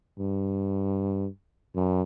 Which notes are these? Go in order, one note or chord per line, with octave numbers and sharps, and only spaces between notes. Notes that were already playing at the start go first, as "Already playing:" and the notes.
G2
F#2